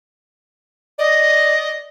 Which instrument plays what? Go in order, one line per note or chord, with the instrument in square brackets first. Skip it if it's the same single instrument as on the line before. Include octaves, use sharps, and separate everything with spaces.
[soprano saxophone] D5 [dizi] D#5